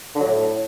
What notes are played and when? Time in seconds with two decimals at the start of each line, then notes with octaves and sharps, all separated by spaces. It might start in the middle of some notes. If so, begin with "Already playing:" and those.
0.15 D3
0.20 F#3
0.26 A2